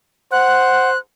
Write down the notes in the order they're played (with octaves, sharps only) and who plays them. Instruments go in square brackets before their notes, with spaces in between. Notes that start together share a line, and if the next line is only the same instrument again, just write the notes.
[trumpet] C5 [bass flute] F#5 [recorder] F#6